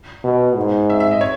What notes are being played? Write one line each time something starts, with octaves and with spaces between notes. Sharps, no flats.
B2
G#2
E5
E5
D#5
C#5